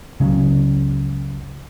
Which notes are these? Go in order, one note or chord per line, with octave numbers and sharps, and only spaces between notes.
F#1 C#2 C#3 F#3